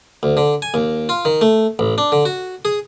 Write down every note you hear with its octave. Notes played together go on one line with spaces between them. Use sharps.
D2
D3
G#5
D#2
F4
D#3
A3
A1
D4
D3
F#4
G#4